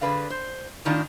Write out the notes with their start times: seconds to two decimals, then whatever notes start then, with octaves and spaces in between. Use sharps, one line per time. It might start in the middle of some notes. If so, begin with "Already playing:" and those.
0.01 D3 G#4 B4 D5 F5
0.30 C5
0.85 A2 D#3 D4 D#4 F4